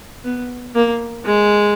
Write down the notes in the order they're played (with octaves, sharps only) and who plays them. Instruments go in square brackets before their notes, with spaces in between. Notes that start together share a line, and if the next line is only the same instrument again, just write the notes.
[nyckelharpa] B3
A#3
G#3